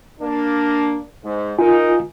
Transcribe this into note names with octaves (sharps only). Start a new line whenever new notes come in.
A#3 D4
G#2
D#4 F4 A#4 G#5